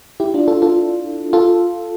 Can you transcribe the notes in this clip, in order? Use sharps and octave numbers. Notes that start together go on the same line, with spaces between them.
E4 G4
D4 F4
F4 A4
F4 A4
F4 A4